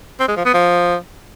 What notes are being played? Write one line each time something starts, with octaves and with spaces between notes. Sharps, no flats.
C4
G#3
F3
B3
F3